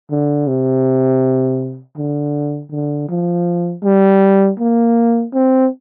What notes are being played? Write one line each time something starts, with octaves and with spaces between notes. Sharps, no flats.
D3
C3
D3
D3
F3
G3
A#3
C4